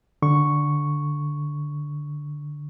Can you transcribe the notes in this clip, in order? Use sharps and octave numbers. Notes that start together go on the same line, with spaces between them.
D3 C#6